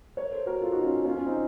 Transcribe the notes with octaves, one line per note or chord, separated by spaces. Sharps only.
A#4 C#5
A4 C5
F#4 A#4
F4 A4
D#4 F#4
C#4 F4
C#4 F4
C#4 F4
C4 D#4